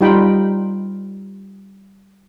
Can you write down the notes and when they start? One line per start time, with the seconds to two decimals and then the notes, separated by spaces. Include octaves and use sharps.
0.01 G3 D#4 F4 G5 B5